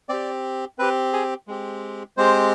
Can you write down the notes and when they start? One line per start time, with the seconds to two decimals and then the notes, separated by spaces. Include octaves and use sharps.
0.09 C4 G4 D5
0.79 C4 G4 B4
1.13 G#4
1.48 G#3 C4 G4
2.17 G#3 C4 G4 C5